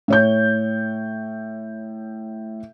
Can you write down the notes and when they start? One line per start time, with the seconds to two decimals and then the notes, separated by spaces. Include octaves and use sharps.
0.08 A2 C#5 G6